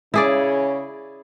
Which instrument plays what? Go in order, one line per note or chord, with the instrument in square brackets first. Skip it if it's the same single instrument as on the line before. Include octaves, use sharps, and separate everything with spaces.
[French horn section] C#3 C#4 [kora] E4 G#4 D5